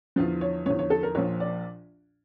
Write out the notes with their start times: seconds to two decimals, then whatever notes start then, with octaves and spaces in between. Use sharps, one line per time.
0.16 E2 D3 F3 F4
0.41 C#5
0.66 E2 D3 F3 C#5
0.79 C#5
0.90 A4
1.03 A#4
1.15 A#1 A#2 F3 C#5
1.40 D5